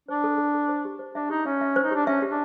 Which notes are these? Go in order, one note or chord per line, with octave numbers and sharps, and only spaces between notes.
D4 C5
A4
A4
A4
C5
G4
C5
D4 E5
D#4 G4
C#4 E5
E5
C5
D#4
D4 G4
C#4 E5
G4
D4